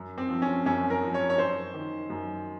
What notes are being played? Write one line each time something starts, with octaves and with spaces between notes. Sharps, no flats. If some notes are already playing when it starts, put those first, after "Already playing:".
Already playing: F#2
C4
F3
C#4
F#2 C#4
A#4
F3
C#5
C#5
F#2 C5
D#3
F#2